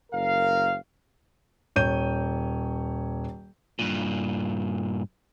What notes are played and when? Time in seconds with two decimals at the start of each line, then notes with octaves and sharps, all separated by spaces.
0.13 F#1 A#4 F5
1.76 D#1 C#5 G6 D#7
3.79 G2 A#2